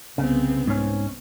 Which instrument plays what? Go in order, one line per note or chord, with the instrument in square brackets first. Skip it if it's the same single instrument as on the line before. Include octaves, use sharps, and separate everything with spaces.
[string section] C2 B3 C4 [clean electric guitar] C#3
[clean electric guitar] G#2 C#4